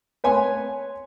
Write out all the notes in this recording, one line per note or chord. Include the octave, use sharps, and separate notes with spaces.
B4 C#5 G#5 C6